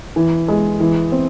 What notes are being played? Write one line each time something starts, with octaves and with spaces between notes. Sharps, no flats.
E3
G#3
E3
C4